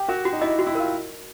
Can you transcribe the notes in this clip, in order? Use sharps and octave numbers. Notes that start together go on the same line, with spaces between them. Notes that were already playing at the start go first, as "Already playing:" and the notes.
Already playing: G4
F#4 A#4
F#4
D#4
E4 D#5
F#4
E4
F4 A#4